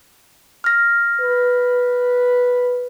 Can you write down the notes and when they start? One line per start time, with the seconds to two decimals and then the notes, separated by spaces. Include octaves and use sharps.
0.64 F6 A#6
1.21 B4